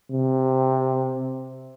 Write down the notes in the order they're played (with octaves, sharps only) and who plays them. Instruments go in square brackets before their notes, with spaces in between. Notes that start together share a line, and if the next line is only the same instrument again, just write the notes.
[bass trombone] C3